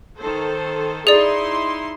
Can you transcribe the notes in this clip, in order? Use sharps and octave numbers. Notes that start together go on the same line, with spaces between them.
D#3 A4 C5
D#4 E4 G#4 D5 C6